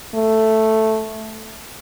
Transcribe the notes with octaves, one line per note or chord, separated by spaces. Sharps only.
A3